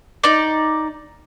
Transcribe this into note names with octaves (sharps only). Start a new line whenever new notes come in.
D#4 D5